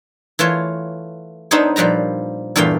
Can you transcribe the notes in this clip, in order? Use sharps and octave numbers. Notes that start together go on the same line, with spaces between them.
E3 A3 F4 C#5
B3 D4 D#4 A4 C5 C#5
A#2 F3 G3 B4 A#5
E2 G2 A#2 A3 F5 G5